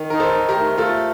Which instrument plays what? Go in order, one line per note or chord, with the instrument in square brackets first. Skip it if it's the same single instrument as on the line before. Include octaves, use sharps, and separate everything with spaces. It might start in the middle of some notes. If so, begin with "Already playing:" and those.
Already playing: [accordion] D#3
[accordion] D#4 [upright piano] A#4
[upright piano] A4 C5
[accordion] D#3
[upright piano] G4 A#4
[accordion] A3
[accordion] A3 [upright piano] F4 A4